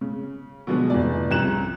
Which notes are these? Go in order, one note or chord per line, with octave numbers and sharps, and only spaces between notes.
C#3
B2 D3 F3 F#3 G#3 B3
F1 E3 G#4 D5
C2 C#3 F3 F#6 E7